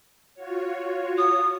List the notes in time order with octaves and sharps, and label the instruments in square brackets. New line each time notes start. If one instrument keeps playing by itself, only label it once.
[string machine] F4 F#4 C#5
[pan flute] D#6